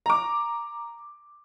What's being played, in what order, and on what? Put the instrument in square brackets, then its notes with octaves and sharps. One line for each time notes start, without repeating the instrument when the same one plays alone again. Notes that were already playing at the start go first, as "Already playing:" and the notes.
[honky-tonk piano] A#5 D6